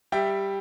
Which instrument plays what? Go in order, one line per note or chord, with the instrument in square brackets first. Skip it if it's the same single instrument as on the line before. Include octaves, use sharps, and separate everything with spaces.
[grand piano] G3 E5 G5